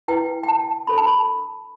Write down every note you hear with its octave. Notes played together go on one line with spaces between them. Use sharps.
E4 B4 G5
G5
A5
D4 A4 C5 B5
A5
B5